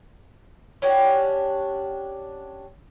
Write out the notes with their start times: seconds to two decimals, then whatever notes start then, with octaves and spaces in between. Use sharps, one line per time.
0.82 C#4 D4 F#4 G4